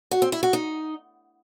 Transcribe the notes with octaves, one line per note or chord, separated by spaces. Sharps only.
F#4
C4
E4
F#4
D#4